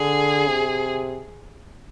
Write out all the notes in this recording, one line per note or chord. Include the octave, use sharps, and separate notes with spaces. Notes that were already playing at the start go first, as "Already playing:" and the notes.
Already playing: D3 G#4
C3